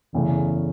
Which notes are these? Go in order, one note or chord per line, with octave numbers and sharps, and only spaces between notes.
F#1 E2 C#3 E3 A3